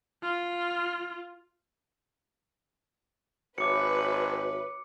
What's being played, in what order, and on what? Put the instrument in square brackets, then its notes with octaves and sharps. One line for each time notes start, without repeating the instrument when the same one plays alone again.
[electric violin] F4
[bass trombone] G#1 [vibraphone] F#4 C#5 E5 [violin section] B4 [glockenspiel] D6 C#7